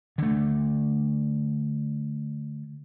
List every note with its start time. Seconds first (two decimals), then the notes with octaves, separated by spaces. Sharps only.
0.18 D3 A3